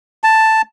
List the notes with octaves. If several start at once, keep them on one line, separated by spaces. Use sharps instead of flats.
A5